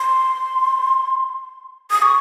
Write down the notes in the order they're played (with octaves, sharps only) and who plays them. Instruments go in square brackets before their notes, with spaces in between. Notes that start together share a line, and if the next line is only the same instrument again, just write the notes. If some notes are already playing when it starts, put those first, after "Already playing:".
Already playing: [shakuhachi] C6
D#6
C#6